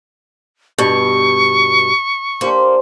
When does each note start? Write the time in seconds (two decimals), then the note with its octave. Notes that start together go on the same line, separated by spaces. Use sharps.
0.78 G2 B2 C#6
2.41 A#3 D4 G4 C5